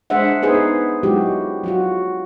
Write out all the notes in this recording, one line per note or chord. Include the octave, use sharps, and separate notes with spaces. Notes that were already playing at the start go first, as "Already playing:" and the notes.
G#3 D4 G#4 C5 E5 F#5
B3 D#4 G#4 B4 C5
F#3 G#3 E4 F#4 G4
F#3 F4 F#4